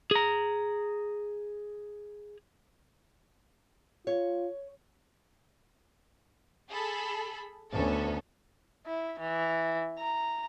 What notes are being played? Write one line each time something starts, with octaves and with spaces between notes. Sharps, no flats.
G#4 A#5
F4 C#5
G#4 A4 B5
D2 B3 C#4 A4
E4
E3
A#5